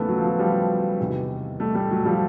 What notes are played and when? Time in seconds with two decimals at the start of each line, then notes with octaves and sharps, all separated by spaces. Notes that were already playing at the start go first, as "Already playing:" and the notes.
Already playing: D#2 C#3 E3 A3 B3
0.08 F#3
0.18 F3
0.24 F#3
0.39 F3 G3
0.99 E2 C3 D#3
1.60 G3 A3
1.75 G3 A3
1.91 F#3
2.05 F3 G3